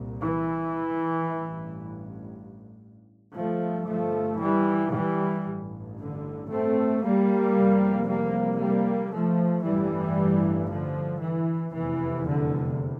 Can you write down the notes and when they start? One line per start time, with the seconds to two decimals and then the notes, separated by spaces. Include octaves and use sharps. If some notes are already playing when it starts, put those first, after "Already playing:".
Already playing: C2 A#2
0.21 E3
1.26 A1 G2
3.35 G1 G2 F3 A3
3.88 F3 A3
4.40 E3 G3
4.92 E3 G3
5.44 A1 G2
5.97 D3
6.49 A3 C4
7.02 G3 A#3
7.55 F1 E2 C3
8.07 G3 A#3
8.59 G3 A#3
9.11 F3 A3
9.63 A1 G2 E3 G3
10.68 D3 F3
11.20 E3
11.73 F1 E2 C3 E3
12.26 D3